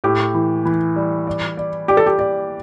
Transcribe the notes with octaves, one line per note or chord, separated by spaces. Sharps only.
A2 G4
E3
E3
G3
D5
D5
G4 D5
A4
G4
D5